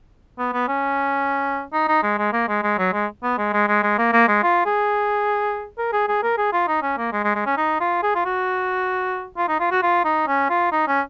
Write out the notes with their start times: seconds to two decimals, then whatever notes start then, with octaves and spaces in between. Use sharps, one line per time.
0.39 B3
0.54 B3
0.68 C#4
1.73 D#4
1.88 D#4
2.03 G#3
2.18 G#3
2.33 A#3
2.48 G#3
2.63 G#3
2.78 F#3
2.93 G#3
3.23 B3
3.38 G#3
3.53 G#3
3.68 G#3
3.83 G#3
3.98 A#3
4.13 A#3
4.28 G#3
4.43 F4
4.66 G#4
5.78 A#4
5.93 G#4
6.08 G#4
6.23 A#4
6.38 G#4
6.53 F4
6.68 D#4
6.83 C#4
6.98 A#3
7.13 G#3
7.24 G#3
7.35 G#3
7.46 C#4
7.57 D#4
7.80 F4
8.03 G#4
8.15 F4
8.25 F#4
9.37 F4
9.49 D#4
9.60 F4
9.72 F#4
9.83 F4
10.05 D#4
10.27 C#4
10.50 F4
10.72 D#4
10.88 C#4